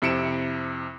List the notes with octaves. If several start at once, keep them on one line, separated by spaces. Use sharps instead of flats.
F2 C3 E4 C#7 D7 E7